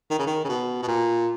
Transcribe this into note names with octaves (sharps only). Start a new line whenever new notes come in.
D#3
C#3
D#3
C#3
B2
B2
A#2